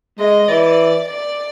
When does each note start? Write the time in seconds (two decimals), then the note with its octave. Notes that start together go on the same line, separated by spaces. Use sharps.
0.19 G#3 D#5
0.48 E3 D5
1.07 D5